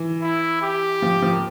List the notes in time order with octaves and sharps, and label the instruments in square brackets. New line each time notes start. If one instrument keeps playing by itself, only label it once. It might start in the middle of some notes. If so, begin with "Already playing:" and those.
Already playing: [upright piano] E3
[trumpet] E4
G4
[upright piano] F3
F3
A#3